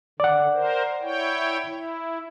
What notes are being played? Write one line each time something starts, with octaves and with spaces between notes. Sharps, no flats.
D3 D5 F#5
A#4 C5
E4 C#5 G5
E4